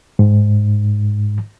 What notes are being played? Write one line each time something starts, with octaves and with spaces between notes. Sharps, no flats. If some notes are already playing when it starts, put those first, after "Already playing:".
G#2